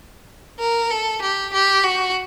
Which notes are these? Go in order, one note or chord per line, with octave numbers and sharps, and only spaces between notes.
A#4
A4
G4
G4
F#4